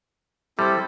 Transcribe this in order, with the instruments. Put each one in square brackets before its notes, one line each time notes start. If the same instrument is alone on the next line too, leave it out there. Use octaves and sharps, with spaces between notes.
[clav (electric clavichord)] G3 [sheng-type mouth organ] C4 E4 A4